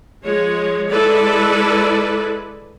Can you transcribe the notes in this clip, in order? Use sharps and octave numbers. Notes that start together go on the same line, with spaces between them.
F3 G#3 C#5
G#3 E4 A4 B4 D5